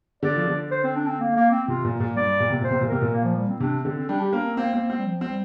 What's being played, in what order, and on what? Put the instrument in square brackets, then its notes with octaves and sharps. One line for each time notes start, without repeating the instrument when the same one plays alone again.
[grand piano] D3 [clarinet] D5
[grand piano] F3
D3
[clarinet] C5
C4
D4
C4
A#3
A#3
C4
[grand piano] C3 [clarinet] F4
[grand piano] A#2
A#2
[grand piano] G2 [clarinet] D5
[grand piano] A#2
C3
[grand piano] A#2 [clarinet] C5
[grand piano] C3
A#2
[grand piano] C3 [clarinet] A#4
[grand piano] A#2
[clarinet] A#3
F3
G3
C4
[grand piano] C3 [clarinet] D4
[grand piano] D3 [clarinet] C4
[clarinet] C4
[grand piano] G3 [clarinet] D4
[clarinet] G4
[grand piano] A#3 [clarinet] D4
[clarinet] C4
[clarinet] A#3 [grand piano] C4
[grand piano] C4
C4
[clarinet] G3
F3
[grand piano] C4
[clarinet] G3